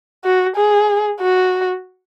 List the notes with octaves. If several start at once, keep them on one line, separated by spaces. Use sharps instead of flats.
F#4
G#4
F#4